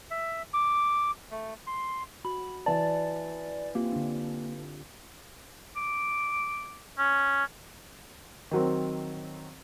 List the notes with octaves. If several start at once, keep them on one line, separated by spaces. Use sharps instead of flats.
E5
D6
A3
C6
F#4 B5
E3 D5 A5
A#3 C4 F4 G4
D3 D4
D6
C#4
D#3 F#3 C4